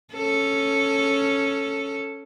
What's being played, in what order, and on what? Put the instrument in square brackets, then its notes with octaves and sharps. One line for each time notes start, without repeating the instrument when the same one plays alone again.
[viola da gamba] C#4 A4